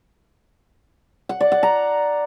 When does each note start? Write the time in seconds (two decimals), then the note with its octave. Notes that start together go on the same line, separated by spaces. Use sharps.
1.29 F#5
1.40 D5
1.52 F#5
1.63 A#5